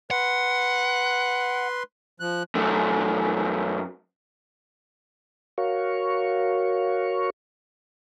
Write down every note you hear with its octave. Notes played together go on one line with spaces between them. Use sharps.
B4 F#5 C6
F3 F#6
F#2 A3
F#4 A#4 C#5 F5 C#6